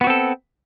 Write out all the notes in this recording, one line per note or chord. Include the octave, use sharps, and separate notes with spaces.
B3 C4 F#4 A4